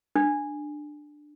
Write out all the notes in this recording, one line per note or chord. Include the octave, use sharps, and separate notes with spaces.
D4